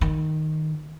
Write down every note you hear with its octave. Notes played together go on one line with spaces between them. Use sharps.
D#3